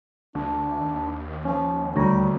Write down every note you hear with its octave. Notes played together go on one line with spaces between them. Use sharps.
D2 D4
D#2
F3 C#4
D2 G3 C#5 A#5